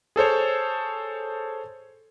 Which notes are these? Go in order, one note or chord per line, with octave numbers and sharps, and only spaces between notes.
G#4 A4 C5 C#5